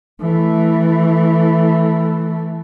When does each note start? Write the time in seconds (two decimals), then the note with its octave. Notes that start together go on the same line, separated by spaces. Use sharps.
0.20 E3 A3